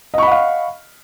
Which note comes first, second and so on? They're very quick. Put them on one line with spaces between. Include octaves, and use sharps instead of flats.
D#5 C#6 B5 F#5 F5